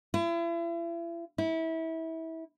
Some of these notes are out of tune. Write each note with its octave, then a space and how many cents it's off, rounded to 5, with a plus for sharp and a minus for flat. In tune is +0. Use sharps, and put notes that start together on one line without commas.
E4 +40
E4 -25